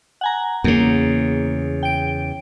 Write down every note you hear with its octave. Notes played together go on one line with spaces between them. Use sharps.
F#5 G#5 A#5
E2 C#3 A#3
G5 D7